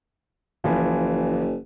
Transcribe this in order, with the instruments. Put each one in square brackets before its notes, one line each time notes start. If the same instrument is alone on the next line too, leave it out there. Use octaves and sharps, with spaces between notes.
[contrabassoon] F#1 [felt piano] E3 F3